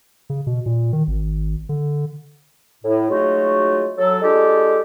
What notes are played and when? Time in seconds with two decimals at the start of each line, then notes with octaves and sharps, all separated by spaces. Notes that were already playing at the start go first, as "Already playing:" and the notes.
0.30 C#3
0.47 B2
0.66 A#2
0.93 D#3
1.08 G#1
1.69 D3
2.83 A2
3.09 F#3 G#3 A3 D#4 F4 F#4
3.97 F#3 A4
4.21 G#3 D4 F4 G4 A4